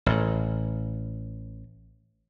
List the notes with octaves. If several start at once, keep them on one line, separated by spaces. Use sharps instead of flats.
A1 A2